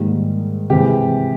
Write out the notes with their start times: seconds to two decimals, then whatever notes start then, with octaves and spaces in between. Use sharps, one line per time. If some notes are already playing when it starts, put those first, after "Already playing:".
Already playing: G#2 D#3 G3 A#3
0.70 C3 E3 G#3 G4